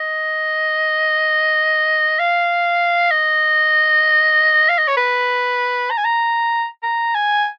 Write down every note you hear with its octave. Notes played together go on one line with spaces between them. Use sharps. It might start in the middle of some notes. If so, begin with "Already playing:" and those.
Already playing: D#5
F5
D#5
F5
D#5
C#5
B4
A#5
G#5
A#5
A#5
G#5